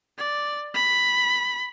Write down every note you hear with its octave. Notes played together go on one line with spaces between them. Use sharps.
D5
B5